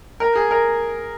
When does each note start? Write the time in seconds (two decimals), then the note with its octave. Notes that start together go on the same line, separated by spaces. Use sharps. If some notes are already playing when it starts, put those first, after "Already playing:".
0.20 A#4
0.35 G#4
0.51 A#4